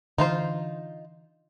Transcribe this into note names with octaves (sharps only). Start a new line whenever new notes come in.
D3 E3 D#4 F4 C5